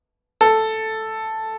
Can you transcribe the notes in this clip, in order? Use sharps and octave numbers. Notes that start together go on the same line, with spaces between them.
A4